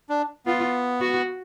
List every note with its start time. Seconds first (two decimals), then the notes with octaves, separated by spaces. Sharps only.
0.09 D4
0.46 B3 F4
1.01 F#4